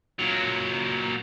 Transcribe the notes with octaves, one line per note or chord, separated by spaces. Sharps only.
A#2 F#3